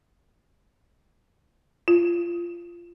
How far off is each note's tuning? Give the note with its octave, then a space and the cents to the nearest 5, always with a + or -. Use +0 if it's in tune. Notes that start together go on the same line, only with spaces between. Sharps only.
F4 -20